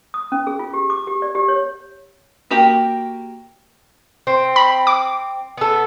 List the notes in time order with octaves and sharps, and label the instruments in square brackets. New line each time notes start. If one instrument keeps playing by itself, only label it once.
[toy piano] D#6
C#4
G#4
F4
G4
D6
G4
D5
G4
C#5
[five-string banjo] A#3 F#4 G4 A#4 G5
[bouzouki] C4
[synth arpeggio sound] B5
D6
[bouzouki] B3 A4